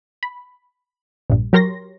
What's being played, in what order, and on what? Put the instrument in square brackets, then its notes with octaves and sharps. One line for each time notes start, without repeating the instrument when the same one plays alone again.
[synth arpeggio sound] B5
A#1 G2
F#3 G4 A#4 C#5 C6 A#6